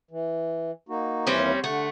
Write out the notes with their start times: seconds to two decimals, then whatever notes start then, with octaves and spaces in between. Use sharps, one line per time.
0.11 E3
0.89 A#3 D#4 F#4
1.27 D#2 E3 G3 C4 C#4 B4
1.64 D3 A3 F#5